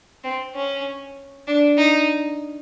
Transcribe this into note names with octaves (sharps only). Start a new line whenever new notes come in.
C4
C#4
D4
D#4